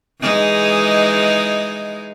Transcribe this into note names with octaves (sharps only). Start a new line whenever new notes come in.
E3 G#3 D#4